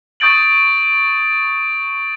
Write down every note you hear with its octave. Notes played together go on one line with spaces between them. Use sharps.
C#6 D#6 G6 A6 D7 F#7